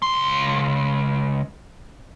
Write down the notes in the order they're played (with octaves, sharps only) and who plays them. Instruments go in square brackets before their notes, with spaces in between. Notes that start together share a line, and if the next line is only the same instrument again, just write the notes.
[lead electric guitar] C#2 C6